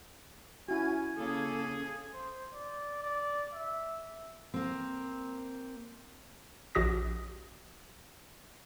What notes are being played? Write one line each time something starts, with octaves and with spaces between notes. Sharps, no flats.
C#4 E4 F#4 G#5
C#3 A#3 C#4 G#4 A4
C5
D5
D5
E5
A#3 C4
A#1 F#4 G4 D#6 A#6